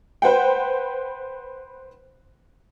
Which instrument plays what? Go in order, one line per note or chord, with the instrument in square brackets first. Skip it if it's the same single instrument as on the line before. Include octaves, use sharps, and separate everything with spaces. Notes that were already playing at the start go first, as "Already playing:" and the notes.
[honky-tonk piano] B4 C5 F#5 G5